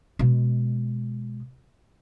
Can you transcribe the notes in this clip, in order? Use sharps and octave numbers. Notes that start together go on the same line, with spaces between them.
B2 G#3